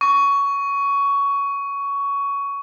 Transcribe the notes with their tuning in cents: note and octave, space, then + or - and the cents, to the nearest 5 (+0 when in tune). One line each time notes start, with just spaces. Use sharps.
C#6 +15